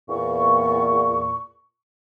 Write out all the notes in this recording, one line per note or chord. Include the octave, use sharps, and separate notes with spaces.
E2 A#2 C#6